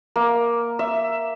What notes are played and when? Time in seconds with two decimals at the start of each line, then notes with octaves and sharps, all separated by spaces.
0.16 A#3
0.79 E5